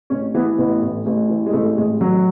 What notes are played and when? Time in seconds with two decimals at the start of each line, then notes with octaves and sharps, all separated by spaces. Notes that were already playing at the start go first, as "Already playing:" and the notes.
0.10 A1 C#4
0.34 E3 B3
0.58 A1 B3
0.82 A2
1.06 A1
1.29 E3
1.46 G#3
1.53 A1 A3
1.77 A2 G#3
2.01 A1 F#3